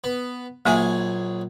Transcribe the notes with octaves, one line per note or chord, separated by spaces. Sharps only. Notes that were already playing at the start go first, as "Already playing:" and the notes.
B3
A#1 F#3 A#3 G#4 E5 G#5